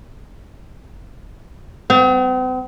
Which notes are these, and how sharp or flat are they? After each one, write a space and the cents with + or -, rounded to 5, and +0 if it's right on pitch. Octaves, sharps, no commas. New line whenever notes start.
C4 -45